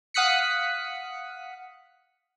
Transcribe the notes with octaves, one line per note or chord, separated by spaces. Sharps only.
F5 F#5 D#6 F#6 B6 C#7